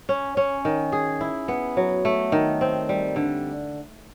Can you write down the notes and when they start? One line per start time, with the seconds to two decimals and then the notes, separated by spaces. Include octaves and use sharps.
0.09 C#4
0.37 C#4
0.65 D#3
0.92 G#4
1.21 E4
1.48 B3
1.77 F#3
2.05 A3
2.32 D#3
2.61 C4
2.89 G3
3.16 D3